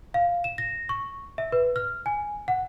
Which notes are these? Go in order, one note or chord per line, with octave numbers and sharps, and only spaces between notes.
F5
E7
A#6
C#6
E5
B4
F6
G#5
F#5